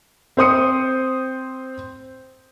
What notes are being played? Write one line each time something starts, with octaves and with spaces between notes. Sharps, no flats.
C4 C5 D#6 C#7